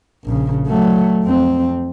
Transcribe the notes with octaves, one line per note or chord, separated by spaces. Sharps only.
A#1 C#3
F#3 A3
F2 C4